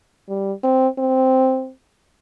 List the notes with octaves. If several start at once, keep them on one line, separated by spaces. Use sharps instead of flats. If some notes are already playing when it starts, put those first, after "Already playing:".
G3
C4
C4